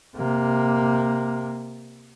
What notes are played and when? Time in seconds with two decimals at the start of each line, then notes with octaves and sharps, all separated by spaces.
0.16 C3 A#3